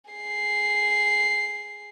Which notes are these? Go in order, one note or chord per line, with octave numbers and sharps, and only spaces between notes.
G#4 C7